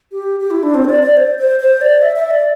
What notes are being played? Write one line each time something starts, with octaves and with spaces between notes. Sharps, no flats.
G4
G4
E4
D4
C4
C5
D5
D5
C5
C5
C5
D5
E5
E5
D5